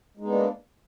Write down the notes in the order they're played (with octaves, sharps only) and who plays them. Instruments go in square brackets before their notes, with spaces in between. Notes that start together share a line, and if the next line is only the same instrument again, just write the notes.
[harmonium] G#3
D#4
B3
D4
A#3